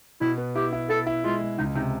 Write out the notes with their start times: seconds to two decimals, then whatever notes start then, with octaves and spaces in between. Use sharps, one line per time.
0.21 B2 E4
0.38 B3
0.56 E4 G4
0.73 E4
0.90 E4 A4
1.07 E4
1.24 G#3 F4
1.41 G#3
1.58 C#2 D#4
1.75 C3 D#4